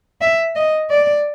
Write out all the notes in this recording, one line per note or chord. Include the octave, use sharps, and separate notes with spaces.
E5
D#5
D5